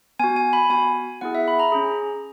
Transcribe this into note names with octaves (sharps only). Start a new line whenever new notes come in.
B3 F#4 G#5
G#5
B5
B3 F#4 G#5
B3 E4 G#4 F#5
E5
B5
A#5
C#4 G#4